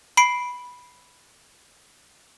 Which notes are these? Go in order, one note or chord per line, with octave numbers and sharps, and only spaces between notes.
B5 C7 D7